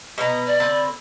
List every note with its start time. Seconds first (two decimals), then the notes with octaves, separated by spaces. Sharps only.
0.18 B2 B3 A#5
0.47 D5
0.60 D3 C4 B4